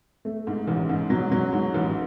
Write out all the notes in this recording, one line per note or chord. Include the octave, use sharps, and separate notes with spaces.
A3
G#2
A1
G#2
F#3
F#3
G#2
A1